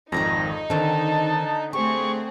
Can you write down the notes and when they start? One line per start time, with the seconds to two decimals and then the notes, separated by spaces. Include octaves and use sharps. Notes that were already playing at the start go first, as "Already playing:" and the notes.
0.12 G#1 F2 D#3 D#4 A#4 A#5 A#6
0.70 D3 D#3 C4 A5
1.73 A3 C4 G4 G#4 C#6